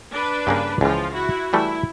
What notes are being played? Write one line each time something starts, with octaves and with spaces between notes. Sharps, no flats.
D4 B4
G2 C#3 A#3
C#2 E3 F3 F4
E4 F#4
E3 G3 A3 E4